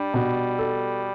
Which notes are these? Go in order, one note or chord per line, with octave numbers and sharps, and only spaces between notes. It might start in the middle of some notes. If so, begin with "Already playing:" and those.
Already playing: G3 D4
B2
A4